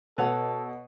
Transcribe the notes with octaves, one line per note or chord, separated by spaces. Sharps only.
B2 A4 B4 C#5 F#5